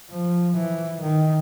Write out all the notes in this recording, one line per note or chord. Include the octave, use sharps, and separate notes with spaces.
F3
E3
D#3